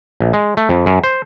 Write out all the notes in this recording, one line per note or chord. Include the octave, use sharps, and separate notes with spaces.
A#1
G#3
A3
F2
F#2
C5